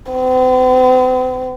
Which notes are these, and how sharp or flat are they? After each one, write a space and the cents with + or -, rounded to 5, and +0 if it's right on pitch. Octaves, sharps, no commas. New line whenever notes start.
C4 -45